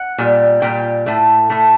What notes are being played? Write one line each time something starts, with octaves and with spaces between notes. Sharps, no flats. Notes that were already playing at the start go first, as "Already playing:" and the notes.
Already playing: F#5
A#2 G3
A#2 G3 G5
A2 A3
A2 A3